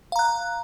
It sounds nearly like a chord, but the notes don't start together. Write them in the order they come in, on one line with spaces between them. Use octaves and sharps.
F5 A#5 F#6